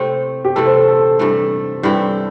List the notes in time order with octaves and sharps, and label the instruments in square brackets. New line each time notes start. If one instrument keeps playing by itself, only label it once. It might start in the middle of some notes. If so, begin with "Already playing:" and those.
Already playing: [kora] C3 A3 C4 E4 [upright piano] C5
[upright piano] G4
[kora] C3 E3 A3 E4 [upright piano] A4
[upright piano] C5
A4
A4
[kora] G2 E3 A3
G2 E3 C4 E4